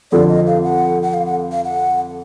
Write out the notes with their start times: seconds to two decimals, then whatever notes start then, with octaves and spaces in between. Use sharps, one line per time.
0.12 F2 D3 F3 D5
0.29 D#5
0.47 F5
0.63 F#5
1.02 F#5
1.14 F5
1.26 F#5
1.52 F5
1.65 F#5